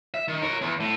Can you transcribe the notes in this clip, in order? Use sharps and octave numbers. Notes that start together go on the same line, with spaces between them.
E5
D#3
A#4 C#5
E2
A2